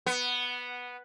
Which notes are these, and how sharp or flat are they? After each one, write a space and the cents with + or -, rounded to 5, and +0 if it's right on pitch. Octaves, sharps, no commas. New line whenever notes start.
B3 -5